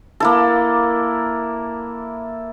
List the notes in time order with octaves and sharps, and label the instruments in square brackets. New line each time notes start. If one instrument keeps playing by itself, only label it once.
[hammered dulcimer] A#3 E4 A4